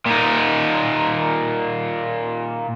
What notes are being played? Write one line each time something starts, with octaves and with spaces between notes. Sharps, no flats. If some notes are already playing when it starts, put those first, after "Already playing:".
A#2 D#4